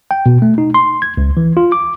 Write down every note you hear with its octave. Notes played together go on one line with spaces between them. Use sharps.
G5
B2
A3
D#4
C6
G#6
C#2
E3
F4
D6